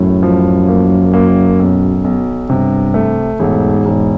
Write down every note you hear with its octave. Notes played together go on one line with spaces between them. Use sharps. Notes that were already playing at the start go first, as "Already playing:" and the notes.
Already playing: F#2 A2
F3
A#3
A#3
B1
B1
G2 C3
A3
E1 G#2
E1